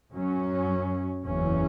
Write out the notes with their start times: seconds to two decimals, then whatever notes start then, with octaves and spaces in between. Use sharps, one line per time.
0.12 F#2 F#3 C#4
1.24 F#1 E2 E3 C#4